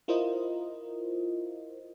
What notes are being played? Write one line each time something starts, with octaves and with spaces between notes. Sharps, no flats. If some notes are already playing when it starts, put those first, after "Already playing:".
E4 F4 A#4 C5 D#5